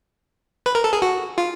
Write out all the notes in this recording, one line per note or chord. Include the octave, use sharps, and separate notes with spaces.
B4
A#4
A4
G#4
F#4
F4